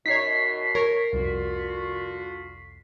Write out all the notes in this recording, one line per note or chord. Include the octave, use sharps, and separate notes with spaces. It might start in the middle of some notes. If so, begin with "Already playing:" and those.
F#2 B2 D#4 C#5 B6 C7
A#4 C#5
C2 F2 D3 F4 F#4